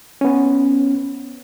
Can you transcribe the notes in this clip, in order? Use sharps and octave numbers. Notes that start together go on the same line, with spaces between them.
B3 C#4